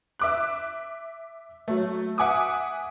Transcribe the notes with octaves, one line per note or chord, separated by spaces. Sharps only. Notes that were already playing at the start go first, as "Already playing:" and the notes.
E5 D6 F#6
F#3 A3
E5 F#5 G#5 D6 D#6